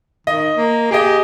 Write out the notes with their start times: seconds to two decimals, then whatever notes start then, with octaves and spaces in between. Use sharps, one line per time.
0.27 D#3 D#5
0.57 A#3
0.91 G4 G#4 D#5